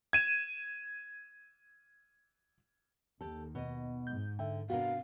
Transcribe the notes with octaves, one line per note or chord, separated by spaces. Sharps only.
G#6 D#7 E7
D#2 G4 A4
B2 D#5
G#2 G6
D3 E5 G5
C3 B3 D4 F#4 A#4 F5